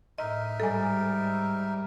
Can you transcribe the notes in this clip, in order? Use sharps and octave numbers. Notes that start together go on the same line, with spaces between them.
A2 D#4 A#4 D#5 E5
G#2 G3 A4 G#5